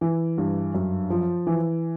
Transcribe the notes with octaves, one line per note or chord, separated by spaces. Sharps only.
E3
G2
F#2
F3
E3